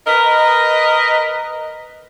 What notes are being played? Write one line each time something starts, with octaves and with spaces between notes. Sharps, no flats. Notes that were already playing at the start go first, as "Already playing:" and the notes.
A#4 B4 D#5